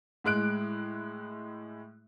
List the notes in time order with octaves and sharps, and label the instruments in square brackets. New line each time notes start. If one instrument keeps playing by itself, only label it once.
[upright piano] A2 G#3 F#6 D7